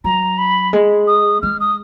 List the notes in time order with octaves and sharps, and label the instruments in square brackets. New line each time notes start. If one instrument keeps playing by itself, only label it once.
[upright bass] F#3 [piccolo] A#5
[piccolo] B5
[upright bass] G#3
[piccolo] D#6
[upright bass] G#3 [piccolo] F6
[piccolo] D#6